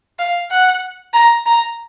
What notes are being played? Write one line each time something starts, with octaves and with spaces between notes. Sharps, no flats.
F5
F#5
A#5
A#5